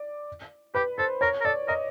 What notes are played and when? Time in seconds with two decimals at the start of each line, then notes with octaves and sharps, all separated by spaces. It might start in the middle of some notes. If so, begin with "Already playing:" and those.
Already playing: D5
0.75 G4 B4
0.98 A4 C5
1.21 A#4 C#5
1.41 A#4
1.45 A4 D5
1.68 A#4 D#5